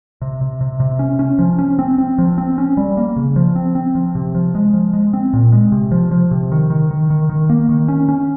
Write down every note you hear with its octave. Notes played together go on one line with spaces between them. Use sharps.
C3
C3
C3
C3
C#4
C#4
F3
C#4
C4
C4
F3
C4
C#4
G3
A#3
C#3
F3
C4
C4
F3
C3
F3
G#3
F3
G#3
C4
A#2
G#3
C3
F3
F3
C3
D#3
D#3
D#3
D#3
D#3
A#3
D#3
C#4
C#4